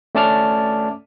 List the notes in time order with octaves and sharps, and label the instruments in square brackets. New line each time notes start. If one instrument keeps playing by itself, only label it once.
[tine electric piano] A3 C#4 D5 A5 D6 F6